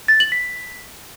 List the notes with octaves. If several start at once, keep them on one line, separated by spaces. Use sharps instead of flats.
A6
F#7
B6